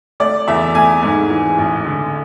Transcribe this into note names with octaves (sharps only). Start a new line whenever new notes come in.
A3 D5
E2 E5
A3 G#5
G#2
E3
A1
D3